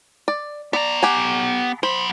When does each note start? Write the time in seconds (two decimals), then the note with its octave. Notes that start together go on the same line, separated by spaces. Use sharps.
0.28 D5
0.73 B3 D5 A#5
1.03 G4 F#5 G#5
1.83 F#3 C5 B5